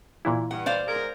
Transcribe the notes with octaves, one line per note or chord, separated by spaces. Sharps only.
A#2 E3 E4
G2 F#5
C5 D5 F5
G#2 G#4 A#4